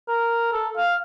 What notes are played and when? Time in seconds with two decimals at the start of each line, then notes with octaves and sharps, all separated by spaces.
0.09 A#4
0.53 A4
0.77 F5